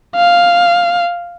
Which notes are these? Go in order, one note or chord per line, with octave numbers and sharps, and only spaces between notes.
F5